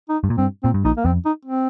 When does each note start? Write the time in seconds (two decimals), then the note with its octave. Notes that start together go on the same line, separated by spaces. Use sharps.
0.09 D#4
0.24 G2
0.30 A#2
0.37 G2 C4
0.63 A#2 C4
0.74 G2
0.85 A#1 A#2 D#4
0.97 A#3
1.05 F2 C4
1.25 D#4
1.45 C4